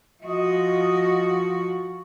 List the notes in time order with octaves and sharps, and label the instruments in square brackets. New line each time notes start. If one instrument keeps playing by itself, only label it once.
[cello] F3 F#4 [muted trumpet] D#5